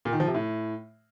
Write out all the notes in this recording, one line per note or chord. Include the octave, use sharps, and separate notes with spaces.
A#2
D#3
F3
C3
A2